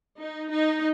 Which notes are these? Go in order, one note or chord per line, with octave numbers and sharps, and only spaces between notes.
D#4
D#4